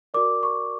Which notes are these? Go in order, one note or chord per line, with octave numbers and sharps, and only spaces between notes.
F#4 A#4 D5 D6
C#6